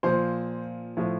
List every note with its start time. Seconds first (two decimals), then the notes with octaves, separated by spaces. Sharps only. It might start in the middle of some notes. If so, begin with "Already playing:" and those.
0.03 A#2 F3 C5
0.97 A2 F3